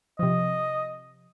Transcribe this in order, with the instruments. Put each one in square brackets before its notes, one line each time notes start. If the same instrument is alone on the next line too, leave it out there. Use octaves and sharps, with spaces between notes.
[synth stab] C3 F3 [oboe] D#5